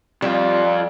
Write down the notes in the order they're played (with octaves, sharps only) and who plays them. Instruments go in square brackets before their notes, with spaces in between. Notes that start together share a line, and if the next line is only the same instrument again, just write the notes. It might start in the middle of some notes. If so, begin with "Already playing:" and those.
[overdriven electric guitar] F2 F4 [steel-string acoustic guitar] G3